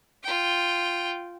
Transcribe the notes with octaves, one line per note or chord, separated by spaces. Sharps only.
F4 G5